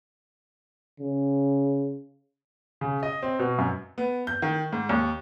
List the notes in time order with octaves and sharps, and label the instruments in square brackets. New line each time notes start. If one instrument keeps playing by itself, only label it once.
[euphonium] C#3
[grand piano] C#3
D#5
C4
B2
F#2
[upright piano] B3
G6
D#3
G#2
D#2